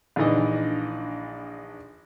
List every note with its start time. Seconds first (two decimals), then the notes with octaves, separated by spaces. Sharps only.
0.16 A#1 D3 E3 D#4 D#5